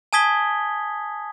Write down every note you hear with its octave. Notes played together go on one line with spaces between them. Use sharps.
G#5 A5 D#6 G#6 B6 G7